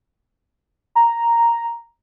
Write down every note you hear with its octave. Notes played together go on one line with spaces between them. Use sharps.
A#5